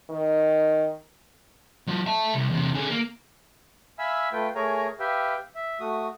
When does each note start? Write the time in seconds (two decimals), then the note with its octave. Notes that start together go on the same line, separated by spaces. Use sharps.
0.10 D#3
1.87 F#3 F4
2.06 E5 A5
2.34 C2
2.50 E2 C3
2.74 D3 G#4
2.90 A#3
3.99 E5 F5 G#5 B5 E6
4.33 A3 F4 B4 G5
4.55 A3 G#4 A#4 C#5 G#5 A#5
5.00 G4 B4 E5 F5 G5
5.55 E5
5.80 A3 F#4 D#6